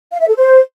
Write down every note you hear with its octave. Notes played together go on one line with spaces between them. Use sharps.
F5
E5
A4
C5